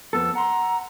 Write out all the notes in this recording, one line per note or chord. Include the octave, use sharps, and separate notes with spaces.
F2 B3 A4 E6
F#5 A#5 C6